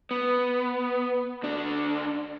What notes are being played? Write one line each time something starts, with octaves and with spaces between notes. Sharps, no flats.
B3
D2 D4